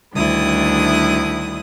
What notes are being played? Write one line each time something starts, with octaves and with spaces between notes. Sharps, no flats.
D2 D#3 G3 D4 E4 D#6